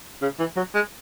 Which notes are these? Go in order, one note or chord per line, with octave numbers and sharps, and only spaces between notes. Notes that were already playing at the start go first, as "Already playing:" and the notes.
C#3
E3
F#3
G#3